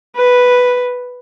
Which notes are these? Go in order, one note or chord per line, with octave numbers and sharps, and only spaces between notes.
B4